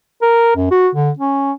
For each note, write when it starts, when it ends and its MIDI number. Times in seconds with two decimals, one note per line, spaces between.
0.22 0.55 70
0.56 0.69 42
0.71 0.89 66
0.95 1.11 50
1.19 1.52 61